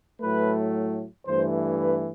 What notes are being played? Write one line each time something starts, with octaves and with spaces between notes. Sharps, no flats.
A2 F#3 A3 B4
G2 E3 A3 C5
B4